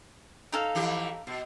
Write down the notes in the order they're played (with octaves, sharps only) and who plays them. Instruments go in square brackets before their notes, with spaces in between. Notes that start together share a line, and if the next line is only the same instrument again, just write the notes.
[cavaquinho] D#4 A4 F5
[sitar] F2 E3 G4
B2